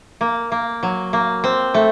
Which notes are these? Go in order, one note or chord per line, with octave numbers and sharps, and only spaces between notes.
A#3
A#3
F#3
A#3
C4
A3